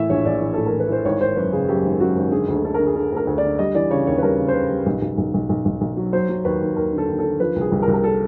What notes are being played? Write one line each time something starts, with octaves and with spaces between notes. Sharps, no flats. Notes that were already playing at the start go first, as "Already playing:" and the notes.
Already playing: A2 E3 E5
A#1 C#5
A#1 D5
E3
A2 A4
A#4
E3
B4
E3 C5
G#1 C#5
G#1 C5
F#2 B4
C#3 G#4
F#2 G4
G#1
F#2 F#4
G#1
D3 G#4
D2 A4
D3 A4
A#4
D3
G#4
D3 A4
D2 A#4
D2
D5
D3
G3 D#5
E3 D5
C#3 C#5
D#2 C#5
B4
G3 A#4
C#3
C5
C#3 B4
G3
B1
B1
B1
B1
B1
B1
B1
F#3
F#3 C5
F#3
D#2 B4
D#2
D#2 A#4
D3
A4
D#2
A4
D3
F3 B4
C2
G#4
C2
A#4
C2
A#4
A4